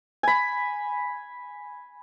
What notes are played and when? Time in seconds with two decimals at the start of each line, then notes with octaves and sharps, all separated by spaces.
0.23 G#5 B5